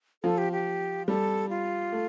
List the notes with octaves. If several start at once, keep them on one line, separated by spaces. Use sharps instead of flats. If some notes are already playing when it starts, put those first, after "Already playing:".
F3 A4
G4
G4
G3 A4
F4
A3